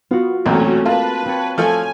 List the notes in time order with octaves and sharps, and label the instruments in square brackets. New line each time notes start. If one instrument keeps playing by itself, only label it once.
[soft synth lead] B3 [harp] F4 F#4
[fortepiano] B1 E2 A#2 [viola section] A3 C#4 [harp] C4 [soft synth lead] F#4
[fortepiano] A#3 F4 [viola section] B4 [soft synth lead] A5
[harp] C4 C#5
[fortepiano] F3 A3 A4 [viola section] G#5 [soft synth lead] F6